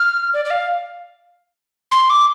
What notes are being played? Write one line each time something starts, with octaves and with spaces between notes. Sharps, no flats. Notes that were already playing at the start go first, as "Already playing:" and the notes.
Already playing: F6
D5
D5
F5
C6
D6